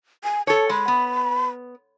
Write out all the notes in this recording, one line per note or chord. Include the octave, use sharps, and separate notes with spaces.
G#5
A4 C#5 A5
G#3 B5
B3